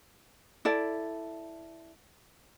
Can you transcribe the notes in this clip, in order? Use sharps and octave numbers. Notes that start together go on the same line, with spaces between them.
E4 A4 D5